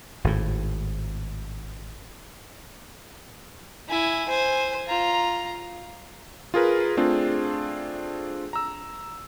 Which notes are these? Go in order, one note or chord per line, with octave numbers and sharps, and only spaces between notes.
G#1 A2
E4 G#5
C5 G#5
F4 A#5
F4 G#4 A#4 B4
A3 C4 D4 F4 G#4
A#5 E6